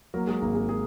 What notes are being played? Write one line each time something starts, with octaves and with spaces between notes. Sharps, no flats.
F#3 A#3 A#4
G#3 G#4
G#1 A#3 A#4
G#3 G#4
G#3 G#4